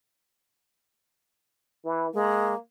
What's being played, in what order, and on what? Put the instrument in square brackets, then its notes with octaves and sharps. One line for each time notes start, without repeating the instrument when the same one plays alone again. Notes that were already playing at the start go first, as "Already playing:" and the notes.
[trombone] E3
[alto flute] G#3 [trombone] A#3